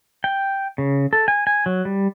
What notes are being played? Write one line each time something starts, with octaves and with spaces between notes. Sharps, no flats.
G5
C#3
A4
G#5
G#5
F#3
G3